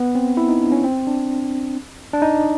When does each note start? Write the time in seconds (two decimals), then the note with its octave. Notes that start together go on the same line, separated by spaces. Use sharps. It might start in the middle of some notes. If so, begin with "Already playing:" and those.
Already playing: B3
0.15 C4
0.37 E4
0.49 D#4
0.61 D4
0.72 C#4
0.84 C4
1.07 D4
2.13 D4
2.22 D#4